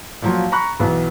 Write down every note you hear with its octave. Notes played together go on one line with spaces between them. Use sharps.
A#2 F3 F#3
A#5 B5 C#6 F#6
B1 E3 B3